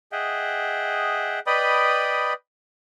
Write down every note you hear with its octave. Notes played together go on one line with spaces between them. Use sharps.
G#4 D#5 E5 F#5 G5
B4 D5 D#5 G5 B5 D#6